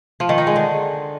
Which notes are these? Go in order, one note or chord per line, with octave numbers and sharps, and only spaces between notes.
F3
D#3
D#4
G#3
D3